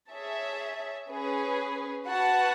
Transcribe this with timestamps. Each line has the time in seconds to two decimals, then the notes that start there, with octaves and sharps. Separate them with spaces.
0.11 G#4 C#5 E5 A5
1.09 C#4 G#4 B4
2.06 F#4 B4 F#5 A5